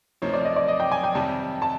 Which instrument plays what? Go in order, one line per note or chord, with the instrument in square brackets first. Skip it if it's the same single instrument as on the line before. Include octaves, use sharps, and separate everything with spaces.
[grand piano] D2 C3 F3 A#3 D#4 [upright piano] C#5
[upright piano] D5
D#5
D5
D#5
G5
G#5
G5
[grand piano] F2 C3 D#3 G3 [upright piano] A5
[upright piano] A5